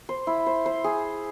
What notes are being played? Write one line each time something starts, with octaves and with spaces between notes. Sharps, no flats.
C5
E4
C5
C5
G#4